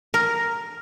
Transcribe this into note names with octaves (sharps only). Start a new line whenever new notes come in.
A#4